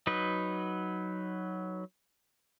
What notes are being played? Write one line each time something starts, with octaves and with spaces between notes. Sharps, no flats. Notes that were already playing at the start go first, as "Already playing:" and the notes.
F#3 D#4 B4